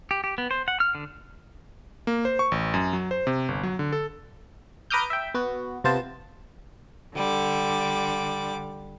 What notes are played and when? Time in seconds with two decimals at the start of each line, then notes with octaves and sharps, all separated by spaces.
0.11 G4
0.24 G4
0.38 B3
0.51 C5
0.68 F#5
0.80 F6
0.95 D3
2.07 A#3
2.25 C5
2.39 C#6
2.52 A1
2.74 F#2
2.93 F#3
3.11 C5
3.27 C3
3.48 G1
3.63 F#3
3.79 D3
3.92 A4
4.90 B4 A#5 D6 D#6 F6 G6
5.10 E5 G5
5.34 B3 F#4
5.84 C3 B3 F4 C5 A5
7.14 D3 G3 D6